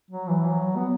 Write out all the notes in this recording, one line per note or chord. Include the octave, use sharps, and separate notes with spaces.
F#3
E3
F#3
B3